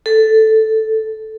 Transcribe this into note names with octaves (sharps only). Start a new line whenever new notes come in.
A4